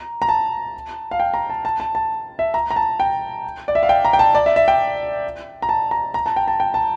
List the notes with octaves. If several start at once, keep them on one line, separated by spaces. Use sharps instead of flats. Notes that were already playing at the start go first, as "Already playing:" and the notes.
Already playing: A#5
A#5
A5
F5
G5
A#5
A5
A5
A5
A5
E5
A#5
A#5
A5
G5
D5
E5
F5
G5
A#5
G5
A5
D5
E5
E5
G5
A#5
A5
A#5
A#5
A5
G5
A5
G5
A5